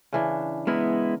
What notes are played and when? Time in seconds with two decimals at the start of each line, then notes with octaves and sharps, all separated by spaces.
0.13 C#3 E3 D4
0.67 G#3 B3 E4 A#4